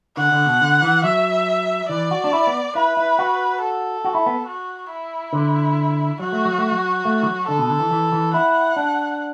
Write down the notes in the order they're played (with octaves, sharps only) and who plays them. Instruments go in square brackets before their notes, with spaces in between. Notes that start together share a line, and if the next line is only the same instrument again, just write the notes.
[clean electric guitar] D3 [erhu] F#5
[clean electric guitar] D3
B2
D3
E3
[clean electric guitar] F#3 [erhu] E5
[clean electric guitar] E3 [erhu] D5
[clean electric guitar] F#4
D4
E4
B3
[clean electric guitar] E4 [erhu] B4
[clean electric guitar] E4
F#4
[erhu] A4
[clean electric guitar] F#4
E4
B3
[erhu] F#4
E4
[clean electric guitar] D3
[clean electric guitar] F#3 [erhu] F#4
[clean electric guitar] A3
F#3
A3
F#3
A3
E3
F#3
[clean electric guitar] D3 [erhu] A4
[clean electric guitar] B2
D3
E3
E3
E3
[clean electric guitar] E4 [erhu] F#5
[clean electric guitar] D4